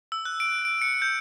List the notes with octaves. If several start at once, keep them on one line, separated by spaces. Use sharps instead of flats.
E6
F#6
D7
D7
C#7
G6